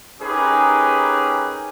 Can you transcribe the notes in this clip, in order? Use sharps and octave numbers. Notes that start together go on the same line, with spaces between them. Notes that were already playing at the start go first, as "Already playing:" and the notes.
C#4 D#4 G4 G#4 A#4 B4